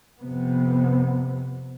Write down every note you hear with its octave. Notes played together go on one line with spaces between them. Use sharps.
F2 C3 B3